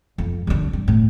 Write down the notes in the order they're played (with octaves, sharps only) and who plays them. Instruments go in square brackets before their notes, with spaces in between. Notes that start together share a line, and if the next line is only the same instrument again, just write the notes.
[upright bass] F2
F#2 D3
G2
A2